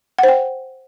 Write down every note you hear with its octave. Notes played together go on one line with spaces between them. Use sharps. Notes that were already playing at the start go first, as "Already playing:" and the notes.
C5 F#5 G5